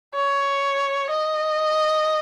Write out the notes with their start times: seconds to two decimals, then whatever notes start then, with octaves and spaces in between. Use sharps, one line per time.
0.15 C#5
1.11 D#5